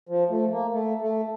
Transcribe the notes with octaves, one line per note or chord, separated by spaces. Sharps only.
F3
A3
A#3
A3
A3